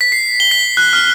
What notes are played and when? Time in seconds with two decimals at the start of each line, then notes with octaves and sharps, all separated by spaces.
0.01 B6
0.12 C7
0.40 G7
0.51 B6
0.77 F#6
0.93 F6